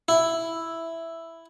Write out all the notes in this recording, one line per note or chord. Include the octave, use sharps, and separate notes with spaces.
E4